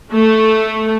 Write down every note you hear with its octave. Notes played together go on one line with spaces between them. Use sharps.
A3